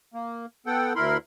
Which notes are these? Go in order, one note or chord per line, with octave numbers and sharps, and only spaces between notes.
A#3
B3 A4 F#5 G5
D2 E4 A#4 B5 C6